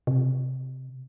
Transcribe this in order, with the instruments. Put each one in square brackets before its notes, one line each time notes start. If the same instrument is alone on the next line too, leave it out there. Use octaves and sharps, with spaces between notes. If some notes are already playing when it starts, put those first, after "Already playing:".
[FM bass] C3